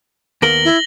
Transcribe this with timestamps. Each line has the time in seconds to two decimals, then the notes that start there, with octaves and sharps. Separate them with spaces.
0.42 D#2 B3 A#4 A#6 F#7 G7
0.65 E4